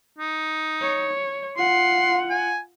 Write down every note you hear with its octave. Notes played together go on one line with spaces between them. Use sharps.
D#4
C#5
F4 F#5 C6
G#5